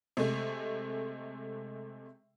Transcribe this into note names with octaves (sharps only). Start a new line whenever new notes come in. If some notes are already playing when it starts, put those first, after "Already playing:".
C3 G#3 A3